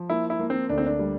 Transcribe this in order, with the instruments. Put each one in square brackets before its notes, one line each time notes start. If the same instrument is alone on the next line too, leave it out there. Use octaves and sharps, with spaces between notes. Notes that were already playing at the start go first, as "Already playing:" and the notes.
Already playing: [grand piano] F3
[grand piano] A#3 [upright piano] E4
[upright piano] E4
[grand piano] A#3
[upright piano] C4
[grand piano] D2 [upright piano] D4
[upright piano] C4
D4
[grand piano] G3